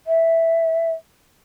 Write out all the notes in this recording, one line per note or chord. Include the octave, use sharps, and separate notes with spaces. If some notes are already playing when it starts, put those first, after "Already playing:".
E5